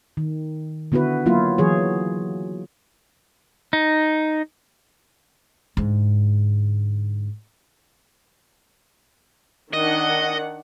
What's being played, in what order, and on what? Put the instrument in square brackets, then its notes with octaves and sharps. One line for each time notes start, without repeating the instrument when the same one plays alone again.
[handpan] D#3
D3 B3 E4 F#4 B4
F#3 A#3 E4 F4
E3 F#3 G#4 C#5
[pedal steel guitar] D#4
[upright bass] G#2 D3
[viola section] D#3 D4 F#5 [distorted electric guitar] D#5